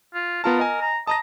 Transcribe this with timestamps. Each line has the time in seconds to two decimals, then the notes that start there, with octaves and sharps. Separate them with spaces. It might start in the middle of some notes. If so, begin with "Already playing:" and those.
0.14 F4
0.44 B3 F4 A#4 A5
0.59 D#5 G#5
0.81 A#5
1.07 D#5 A5 A#5 A#6